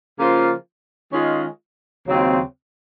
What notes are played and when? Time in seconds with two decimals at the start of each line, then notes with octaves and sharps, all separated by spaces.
0.18 C#3 F3 A#3 F4
1.13 D#3 G#3 C#4 F4
2.07 D#2 C#3 F#3 C4 F4